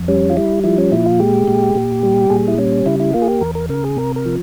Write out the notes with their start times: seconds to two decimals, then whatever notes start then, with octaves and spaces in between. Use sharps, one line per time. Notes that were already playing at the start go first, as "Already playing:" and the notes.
Already playing: F2
0.08 G3 C#4
0.30 F4
0.36 G3 E4
0.64 F3 E4
0.78 C#4
0.92 A#2 E4
1.06 F4
1.20 G#3 G4
1.48 A#2
1.75 A#2
2.03 G3
2.30 A#2 G#4
2.48 E4
2.58 G3 C#4
2.86 C#3 E4
3.00 E4
3.13 A#3 F4
3.22 G#4
3.28 G4
3.41 E2 A#4
3.55 A#4
3.69 C#3 A#4
3.84 G#4
3.97 C3 A#4
4.16 A#4
4.26 F3